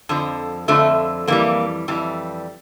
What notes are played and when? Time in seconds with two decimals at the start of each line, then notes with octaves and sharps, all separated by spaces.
0.09 F2 D3 F3
0.68 F2 D3 F3 A3
1.27 F2 E3 G3 A#3
1.88 F2 E3 G3